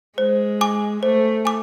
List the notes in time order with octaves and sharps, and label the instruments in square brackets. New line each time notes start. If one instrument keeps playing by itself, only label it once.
[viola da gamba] G#3 [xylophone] C5
[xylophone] G#5 D6
[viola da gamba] A3 [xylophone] C5
[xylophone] G#5 D6